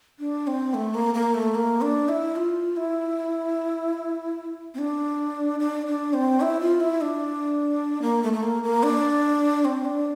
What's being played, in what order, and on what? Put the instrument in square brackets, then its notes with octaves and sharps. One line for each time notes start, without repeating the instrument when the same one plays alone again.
[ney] D4
C4
A3
A#3
A#3
A3
A#3
D4
E4
F4
E4
C4
D4
D4
D4
C4
E4
F4
E4
D4
A#3
A3
A3
A#3
A#3
D4
C4
D4